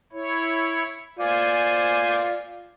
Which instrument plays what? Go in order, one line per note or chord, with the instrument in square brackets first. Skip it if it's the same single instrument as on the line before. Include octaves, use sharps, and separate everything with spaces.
[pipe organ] E4 C#5
[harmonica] F4 D5 [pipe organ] C5 G#5